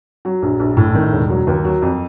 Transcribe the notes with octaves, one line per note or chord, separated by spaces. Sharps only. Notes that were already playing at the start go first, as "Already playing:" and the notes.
F#3
A#1
A#1
A2
D#3
E1
F#3
D#2
F#3
F2